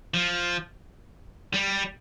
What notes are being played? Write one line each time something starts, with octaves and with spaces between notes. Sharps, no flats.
F3
G3